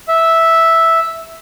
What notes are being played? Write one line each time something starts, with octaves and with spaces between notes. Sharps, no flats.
E5